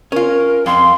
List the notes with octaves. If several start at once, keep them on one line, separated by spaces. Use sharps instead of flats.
C#4 F4 A#4
F2 F5 C6